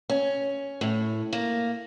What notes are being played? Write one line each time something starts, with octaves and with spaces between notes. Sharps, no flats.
C#4
A2
A#3